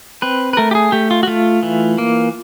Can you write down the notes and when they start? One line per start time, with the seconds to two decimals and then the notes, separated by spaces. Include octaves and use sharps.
0.22 C4 B4
0.53 B4
0.57 A3 A#4
0.71 G4
0.75 G#4
0.92 A3 G4
1.11 F4
1.23 F#4
1.27 A3 F4
1.63 E3
1.98 A#3